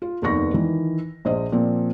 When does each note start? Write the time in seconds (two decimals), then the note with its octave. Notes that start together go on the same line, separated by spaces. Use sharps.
0.02 F4
0.22 F1 D#2 B3 C#6 A#6
0.54 D#3 E3
1.25 A#1 C5 D#5
1.52 A#2 F3 A#3 C4